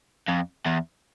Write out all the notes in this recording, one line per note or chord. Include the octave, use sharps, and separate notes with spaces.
F2
E2